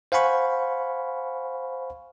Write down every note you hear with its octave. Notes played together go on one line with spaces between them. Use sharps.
C5 F5 F#5 G#5 B5 C#6